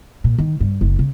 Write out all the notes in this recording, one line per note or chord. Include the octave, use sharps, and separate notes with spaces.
A#2
D#3
G2
F#1
C#3